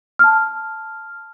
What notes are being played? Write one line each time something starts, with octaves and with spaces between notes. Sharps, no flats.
A5 F6